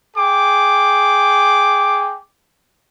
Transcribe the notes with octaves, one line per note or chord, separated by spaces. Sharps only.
G#4 G5 D6